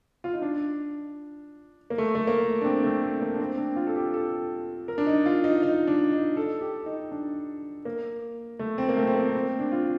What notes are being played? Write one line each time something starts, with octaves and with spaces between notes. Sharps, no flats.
F4
D#4
D4
A#3
A3
A3
A#3
D4
C4
A3
A3
A#3
D4
C4
D4
F4
A4
G4
A4
A#4
D4
D#4
F4
D#4
D#4
D4
D#4
A4
G4
D#4
D4
A#3
A3
C4
A#3
A3
C4
A#3
C4
D4
F4